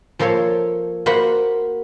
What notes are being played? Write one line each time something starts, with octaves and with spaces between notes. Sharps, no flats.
F3 A#3 A4 C5 C#5
A#3 F#4 C5 F#5 B5